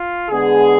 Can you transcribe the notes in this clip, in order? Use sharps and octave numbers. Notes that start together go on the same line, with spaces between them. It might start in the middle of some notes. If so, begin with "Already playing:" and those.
Already playing: F4
D3 G#3 B3 G#4